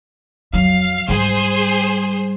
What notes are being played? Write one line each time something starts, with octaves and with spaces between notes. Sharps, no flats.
F2 F#3 F5
G#2 G3 G#4 C5